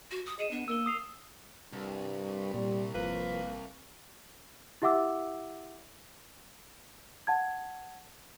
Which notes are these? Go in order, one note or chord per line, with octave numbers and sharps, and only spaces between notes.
F#4
D#6
G#4 D#5 C#7 D#7 E7
B3 D4
A#3 A#4 E6 G7
D#6 C7 F7
C2 G2
A#2 G3
G#1 F3 A#3 B4
E4 G4 E5 F#5 D6 E6
F#5 A5 G#6